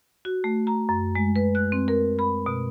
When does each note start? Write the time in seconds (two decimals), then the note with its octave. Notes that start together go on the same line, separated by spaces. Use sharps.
0.25 F#4
0.44 A3
0.67 A#5
0.89 F#2
1.15 G#3
1.36 B4
1.55 F#6
1.72 C4
1.88 A#4
2.19 B5
2.46 B2